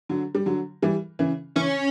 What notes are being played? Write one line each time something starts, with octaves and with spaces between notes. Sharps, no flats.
D3 F#3
G3
D3 F#3
E3 G3
C#3 E3
C#3 E3 C#4